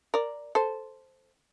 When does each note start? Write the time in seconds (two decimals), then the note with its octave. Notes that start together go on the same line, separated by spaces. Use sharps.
0.14 A#4 D5
0.55 A4 C5